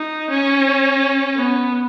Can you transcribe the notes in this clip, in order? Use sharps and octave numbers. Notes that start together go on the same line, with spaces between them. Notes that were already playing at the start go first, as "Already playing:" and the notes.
Already playing: D#4
C#4
B3